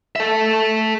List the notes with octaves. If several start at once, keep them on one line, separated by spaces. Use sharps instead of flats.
A4 E5